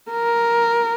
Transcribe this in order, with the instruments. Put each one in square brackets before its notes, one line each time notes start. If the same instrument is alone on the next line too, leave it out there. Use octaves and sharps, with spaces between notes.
[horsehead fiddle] A#4